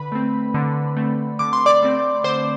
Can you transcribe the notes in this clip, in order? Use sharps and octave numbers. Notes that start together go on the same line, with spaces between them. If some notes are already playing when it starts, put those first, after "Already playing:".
Already playing: D3 B4 B5
A3 C4
D3
A3 C4
D3 D6
C6
D5 D6
A3 C4
D3 C5 C6